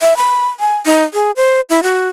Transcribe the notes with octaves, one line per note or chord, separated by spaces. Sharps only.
E5
B5
G#5
D#4
G#4
C5
E4
F#4